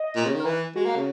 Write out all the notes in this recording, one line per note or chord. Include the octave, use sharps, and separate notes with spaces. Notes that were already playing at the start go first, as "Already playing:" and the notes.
Already playing: D#5
A#2
C#3
D#3
A#4
E3 B4
G#3 F#4
A#3
C#3